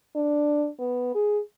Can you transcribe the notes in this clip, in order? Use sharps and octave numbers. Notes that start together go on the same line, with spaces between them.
D4
B3
G#4